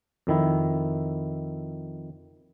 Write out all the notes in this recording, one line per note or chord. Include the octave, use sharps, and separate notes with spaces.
F2 D#3 E4